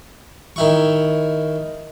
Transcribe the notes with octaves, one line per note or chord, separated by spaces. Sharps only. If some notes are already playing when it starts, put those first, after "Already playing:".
D#3 E4 C#6